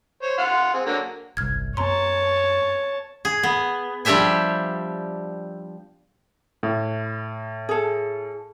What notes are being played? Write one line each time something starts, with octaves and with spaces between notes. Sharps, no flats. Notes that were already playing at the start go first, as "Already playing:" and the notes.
C5 C#5
F5 F#5 C6
C4 G#4
D3 F#3 A#3
G1 C2 F6 G#6
F#2 B3 C#5 A5 A#5 C6
G#4
B3
F3 G3 D4 G4 E5 G#5
A2
G#4 A4